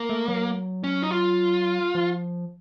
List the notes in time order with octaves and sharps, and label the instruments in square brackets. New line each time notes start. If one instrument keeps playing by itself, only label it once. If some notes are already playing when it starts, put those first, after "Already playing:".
Already playing: [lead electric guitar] A#3
[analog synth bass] A3
F#3
[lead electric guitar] C#4
D#4
F4
[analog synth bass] F3